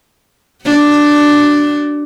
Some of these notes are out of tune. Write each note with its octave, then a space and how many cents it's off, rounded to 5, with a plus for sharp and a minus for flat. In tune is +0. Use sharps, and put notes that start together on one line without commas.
D4 +0 F#4 +40